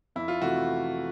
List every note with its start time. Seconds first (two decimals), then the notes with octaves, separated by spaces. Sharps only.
0.16 F2 E4
0.28 F4
0.42 C3 E3 A3 F#4